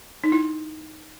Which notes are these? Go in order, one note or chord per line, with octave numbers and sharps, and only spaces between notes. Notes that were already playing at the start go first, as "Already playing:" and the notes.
D#4
E4